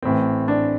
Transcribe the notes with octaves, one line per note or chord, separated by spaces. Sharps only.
A1 A2 E3 C4
D4